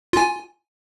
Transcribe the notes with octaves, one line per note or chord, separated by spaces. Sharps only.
F4 G#5